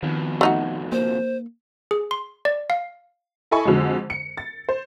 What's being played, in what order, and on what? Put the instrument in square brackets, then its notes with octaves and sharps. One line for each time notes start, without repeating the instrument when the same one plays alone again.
[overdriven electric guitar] F2 B2 [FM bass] D#3
[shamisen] A3 D#4 F#4
[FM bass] A#3 [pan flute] C5
[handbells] G#4
C6
D5
F5
[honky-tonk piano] E4 A4 D#5 G#5 B5 C#6
F2 D3 F#3 G#3
C#7
A6
C5